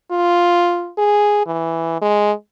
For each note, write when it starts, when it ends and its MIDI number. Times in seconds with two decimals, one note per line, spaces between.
0.11 0.91 65
0.98 1.45 68
1.47 1.98 52
2.02 2.32 56